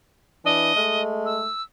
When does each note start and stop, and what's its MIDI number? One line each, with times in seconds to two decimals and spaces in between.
0.45 0.73 52
0.45 0.73 62
0.45 1.02 75
0.76 1.43 56
0.76 1.48 57
1.26 1.62 88